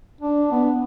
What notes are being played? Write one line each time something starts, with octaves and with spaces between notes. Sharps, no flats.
D4
B3